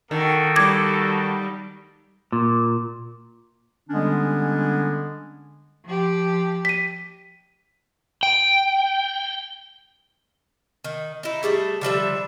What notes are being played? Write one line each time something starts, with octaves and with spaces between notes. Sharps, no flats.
D#3 A#3 F#4 A4
G3 D6 G#6
A#2
D3 G3 G#3 B3 C#4 D4
F3 G4
B6 D#7
G5
D#3
D#4 E4
G3 A3 G#4 E5
D3 F3 G3 E5